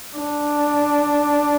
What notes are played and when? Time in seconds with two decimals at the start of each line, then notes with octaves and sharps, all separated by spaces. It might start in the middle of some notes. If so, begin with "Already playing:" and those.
0.16 D4